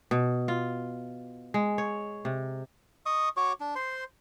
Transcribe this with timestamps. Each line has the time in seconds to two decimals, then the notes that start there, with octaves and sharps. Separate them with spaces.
0.11 B2
0.48 F4
1.54 G#3
1.78 C#5
2.25 C3
3.06 D#5 C#6 D#6
3.37 F#4 C#5 C#6 D6
3.60 D4
3.75 C5 C6